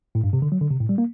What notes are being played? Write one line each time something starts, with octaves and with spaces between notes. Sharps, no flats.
A2
G2
C3
D3
F#3
D3
C3
A2
G3
A#3